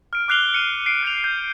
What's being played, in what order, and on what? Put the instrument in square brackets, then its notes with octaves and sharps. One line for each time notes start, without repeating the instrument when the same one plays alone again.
[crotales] F6 D7
D6 F6 F#6 C7 F7 G7
C#7 D#7 F7
C7 D7
F#6 G6 C#7 D7 F7
G6